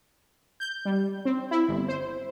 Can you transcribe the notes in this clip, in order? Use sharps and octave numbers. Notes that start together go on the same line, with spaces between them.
G6
G3
C4
E4
G1
C5